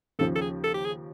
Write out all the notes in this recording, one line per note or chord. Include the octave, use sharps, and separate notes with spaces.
D#2 C#3 F3 A4
A4
G#4
A4
G4
G#4